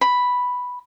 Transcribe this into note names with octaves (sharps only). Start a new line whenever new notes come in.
B5